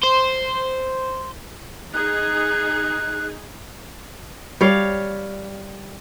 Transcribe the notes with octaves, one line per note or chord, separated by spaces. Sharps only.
C5
D#4 G#4 F#6
G3 C#5 F5